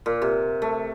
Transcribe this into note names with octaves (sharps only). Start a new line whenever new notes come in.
A#2
C3
A3